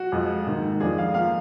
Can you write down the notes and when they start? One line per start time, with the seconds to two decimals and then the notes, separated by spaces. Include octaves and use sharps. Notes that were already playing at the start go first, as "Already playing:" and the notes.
Already playing: F#4
0.12 F2 F3 G#3
0.46 G#2 D#3 A#3
0.80 F2 F3 G#3 D4 G#4
0.98 F5
1.14 F3 A#3 F5